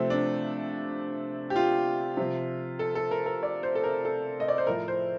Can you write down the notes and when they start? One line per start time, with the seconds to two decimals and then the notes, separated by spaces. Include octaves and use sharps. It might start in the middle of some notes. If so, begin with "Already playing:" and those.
Already playing: C3 F3 A3 C4
0.10 D4
1.50 G4
1.56 F4
2.17 C3 F3
2.79 A4
2.95 A4
3.11 A#4
3.26 A#4
3.43 D5
3.63 C5
3.75 A4
3.84 A#4
4.05 A4
4.40 D#5
4.48 D5
4.58 C5
4.67 A2 F3 A#4
4.88 C5